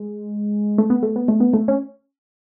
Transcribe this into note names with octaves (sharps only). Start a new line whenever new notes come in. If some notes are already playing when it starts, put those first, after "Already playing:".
Already playing: G#3
A3
B3
A3
B3
A3
B3
A3
C#4